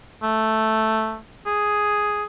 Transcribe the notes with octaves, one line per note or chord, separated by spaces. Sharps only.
A3
G#4